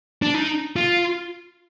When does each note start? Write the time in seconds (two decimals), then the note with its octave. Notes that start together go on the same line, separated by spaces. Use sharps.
0.22 D4
0.34 D#4
0.76 F4